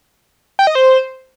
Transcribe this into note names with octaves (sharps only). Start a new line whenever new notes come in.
G5
D#5
C5